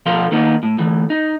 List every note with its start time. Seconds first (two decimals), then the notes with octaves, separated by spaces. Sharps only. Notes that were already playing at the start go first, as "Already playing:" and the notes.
0.06 B2 F3 A4 A#4 F5 C6
0.31 D#3 A#3 B3 D#4
0.63 A2
0.79 D2 E3 A3
1.10 D#4